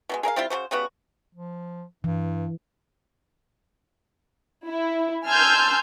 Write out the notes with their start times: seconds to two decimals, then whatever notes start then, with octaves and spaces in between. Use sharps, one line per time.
0.09 B2 D#3 G#3
0.23 G#4 A#4 D#5 F5
0.36 G3 C4 E4 F4
0.50 C#3 A3 F#4 C5
0.71 C#3 G3 B3 F#4
1.35 F3
2.04 G2 E3
4.69 E4
5.26 G#5 A5 C6 E6 F6 G6